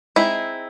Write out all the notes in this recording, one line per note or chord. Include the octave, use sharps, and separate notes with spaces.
G#3 C4 D#4 E4